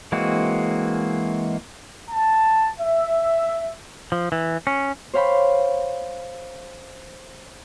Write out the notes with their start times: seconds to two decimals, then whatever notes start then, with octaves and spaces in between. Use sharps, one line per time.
0.12 E3 G#3 A#3 C4 F#4
2.11 A5
2.80 E5
4.12 F3
4.32 E3
4.67 C#4
5.14 C5 C#5 F5 G5 B5 C6